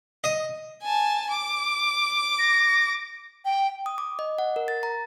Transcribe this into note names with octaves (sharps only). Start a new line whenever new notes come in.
D#5
G#5 A5
D6
A#6
G5
D#6
D6
D#5
F#5
A#4
A6
A#5